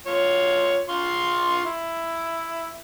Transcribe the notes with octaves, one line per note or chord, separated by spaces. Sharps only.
F4 C#5
F4 C6 C#6
E4